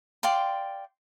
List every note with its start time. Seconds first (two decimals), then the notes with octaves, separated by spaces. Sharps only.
0.23 D5 F5 G5 C6